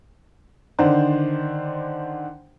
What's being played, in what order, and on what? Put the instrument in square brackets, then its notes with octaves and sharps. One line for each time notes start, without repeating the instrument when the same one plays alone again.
[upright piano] D3 D#3 D4 C5